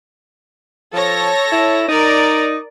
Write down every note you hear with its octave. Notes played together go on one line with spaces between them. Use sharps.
F3 A4 C#5 A#6
E4
D#4 A#4 D5